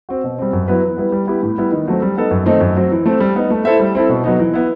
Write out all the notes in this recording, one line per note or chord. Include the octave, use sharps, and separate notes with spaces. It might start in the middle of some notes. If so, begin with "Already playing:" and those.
C4 F#4
B2
G3 C4
F#2
F#3 B3 E4 B4
E3
G3 B3 E4 B4
G3
B3 E4 G4
A2
G3 B3 E4
D#3
F#3 A3 C4
G3
B3 D#4 A4
F#2
D#3 A3 C4 D#4
F#2
F#3 C4
E3
A3 C4
G3
B3 D#4
A3
E4 A4 C5 E5
G3
C4 E4 A4
B2
F#3 B3 D#4
E3
B3 E4